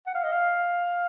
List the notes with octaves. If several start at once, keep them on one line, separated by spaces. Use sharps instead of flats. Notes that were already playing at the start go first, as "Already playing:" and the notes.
F#5
F5
D#5
F5